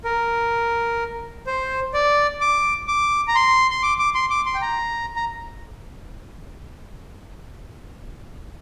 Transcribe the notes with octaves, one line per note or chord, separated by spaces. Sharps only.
A#4
C5
D5
D6
D6
A#5
C6
C6
D6
D6
C6
D6
C6
G5
A#5
A#5